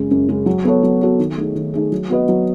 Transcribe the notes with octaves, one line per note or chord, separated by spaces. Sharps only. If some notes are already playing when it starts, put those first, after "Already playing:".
Already playing: F#2 C#3 G#3
F#2
C#3 G#3
F#3
B3 F#4 A4 C#5
F#3
B3 F#4 A4 C#5
D#3
A3 D#4 G#4
D#3
A3 D#4 G#4
F#3
B3 F#4 B4 D#5
F#3